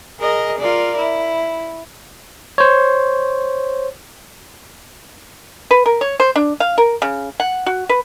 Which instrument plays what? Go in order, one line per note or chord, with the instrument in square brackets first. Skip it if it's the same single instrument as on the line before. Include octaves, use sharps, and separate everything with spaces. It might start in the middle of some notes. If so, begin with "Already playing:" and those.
[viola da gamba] G#4 A#4 D#5
F4 A#4 D5
E4
[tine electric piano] C5 C#5
[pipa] B4
A#4
C#5
C5
D4
F5
A#4
C#3
F#5
F#4
B4